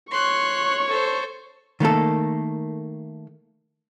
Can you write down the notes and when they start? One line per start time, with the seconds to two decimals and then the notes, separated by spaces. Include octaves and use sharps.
0.11 C#5 C6 C#6 F#6
0.88 A4 C5
1.80 D#3 A3 A#3 A4